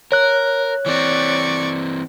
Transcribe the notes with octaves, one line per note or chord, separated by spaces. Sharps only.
A#4 C#5 F#6
E3 C4 D5 C#6